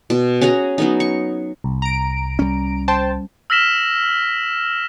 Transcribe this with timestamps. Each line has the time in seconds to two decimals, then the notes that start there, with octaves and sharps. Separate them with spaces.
0.10 B2
0.41 C#4 F#4 G#4 A#5
0.78 F#3 B3 D#4
1.00 C#6
1.64 C2
1.82 A#5 D7
2.39 G3 C#4
2.88 C5 G5 A5
3.50 E6 F6 A#6 B6 E7 G7